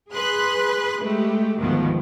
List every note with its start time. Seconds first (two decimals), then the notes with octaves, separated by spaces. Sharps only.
0.11 G#4 B4 C6 F#6
1.02 G#3 A3 G4
1.60 D2 G#2 B2 D#3 F3